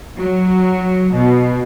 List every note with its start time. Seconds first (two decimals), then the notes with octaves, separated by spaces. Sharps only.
0.19 F#3
1.18 B2